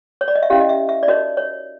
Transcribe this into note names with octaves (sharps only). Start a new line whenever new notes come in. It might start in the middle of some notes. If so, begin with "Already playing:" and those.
C#5
D5
D#5
E5
C#4 E4 G4 F5
D#5
E5
E5
D5
D#4 F#4 A#4 C#5 D#5
C#5